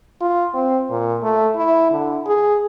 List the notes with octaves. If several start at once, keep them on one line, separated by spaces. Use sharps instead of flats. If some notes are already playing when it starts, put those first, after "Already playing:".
F4
C4
A#2
A3
E4
D3
G#4